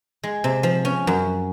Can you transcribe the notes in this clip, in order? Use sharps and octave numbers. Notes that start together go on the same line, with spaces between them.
G#3
C3
F3
C#4
F#2